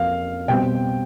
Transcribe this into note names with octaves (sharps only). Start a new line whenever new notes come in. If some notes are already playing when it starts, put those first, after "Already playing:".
Already playing: F2 F3 A#3 F5
B2 G3 C4 G5